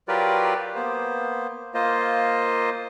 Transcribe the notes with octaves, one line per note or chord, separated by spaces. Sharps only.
F#3 F4 G4 A#4 B4 D5
A#3 B3 C5
A#3 F4 C5 D#5